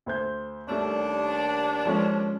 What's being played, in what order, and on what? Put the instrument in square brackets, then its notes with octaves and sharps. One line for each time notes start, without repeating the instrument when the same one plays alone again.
[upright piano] D2 C5 G6
[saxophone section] D#2 D4 [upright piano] G3 A3 C#4
[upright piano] F3 G#3 C#4